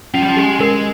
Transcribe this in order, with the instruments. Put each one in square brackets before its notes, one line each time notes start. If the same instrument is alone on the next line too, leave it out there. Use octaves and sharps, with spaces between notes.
[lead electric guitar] F3 [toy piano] C#4
[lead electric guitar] G3
F3
[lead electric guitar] G#3 [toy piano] G4
[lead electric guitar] G#3 [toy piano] A#4